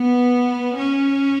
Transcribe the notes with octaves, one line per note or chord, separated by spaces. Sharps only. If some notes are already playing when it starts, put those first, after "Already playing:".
Already playing: B3
C#4